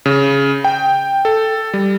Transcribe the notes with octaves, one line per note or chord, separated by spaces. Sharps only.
C#3
G5
A4
G3